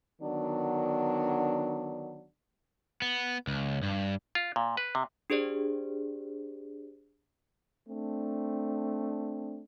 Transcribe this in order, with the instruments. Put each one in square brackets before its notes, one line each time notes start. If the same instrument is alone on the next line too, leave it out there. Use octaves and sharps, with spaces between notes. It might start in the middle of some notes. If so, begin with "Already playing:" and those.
[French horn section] D3 D#3 F#3 B3 D4
[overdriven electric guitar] B3
C#2
G2
[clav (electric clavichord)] F4
A#2
B4
C3
[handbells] D4 G4 G#4 C5 D5
[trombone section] A3 C4 D4